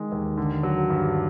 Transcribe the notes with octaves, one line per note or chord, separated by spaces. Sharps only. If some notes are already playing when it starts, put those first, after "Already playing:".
Already playing: D#3 G#3
D#2
D3
F#3
G2